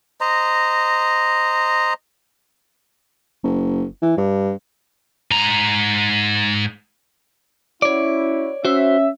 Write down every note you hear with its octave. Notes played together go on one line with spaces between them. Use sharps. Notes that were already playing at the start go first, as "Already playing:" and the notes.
C5 D#5 A#5
F#1
E3
G2
G#2 A#5
C#4 E4 F#4 C#5 D5
C#4 F#4 C5 E5